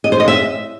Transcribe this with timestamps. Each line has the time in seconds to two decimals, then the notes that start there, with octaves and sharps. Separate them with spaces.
0.04 D#5
0.12 C5
0.20 D#5
0.28 E5